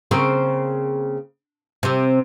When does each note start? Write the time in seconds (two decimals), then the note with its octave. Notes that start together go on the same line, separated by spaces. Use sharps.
0.11 C#3 A#3 C4
1.83 C3 C4